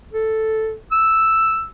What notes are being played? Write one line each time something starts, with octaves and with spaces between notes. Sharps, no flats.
A4
E6